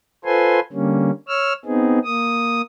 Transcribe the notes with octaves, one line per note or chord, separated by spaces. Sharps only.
F4 A4 B4 C5 G#5 C6
D3 G3 A#3 C#4
C#5 E6 F6
B3 C4 D#4 G#4
A#3 D#6